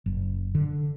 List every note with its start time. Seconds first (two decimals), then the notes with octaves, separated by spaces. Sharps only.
0.06 F#1
0.55 D3